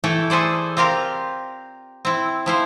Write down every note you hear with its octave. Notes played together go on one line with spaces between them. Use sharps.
E3 A3 E4 A4 G5
G#4 A4 B4 C5 D5
C4 F4 G4 A#4 F5
C4 E4
F3 E4 C5